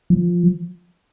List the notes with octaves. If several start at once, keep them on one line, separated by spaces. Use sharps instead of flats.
F3